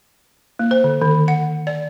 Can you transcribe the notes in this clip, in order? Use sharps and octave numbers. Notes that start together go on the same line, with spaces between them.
A#3
C5
D3
D#3
F#5
D5